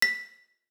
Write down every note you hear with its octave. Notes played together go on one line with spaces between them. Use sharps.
B6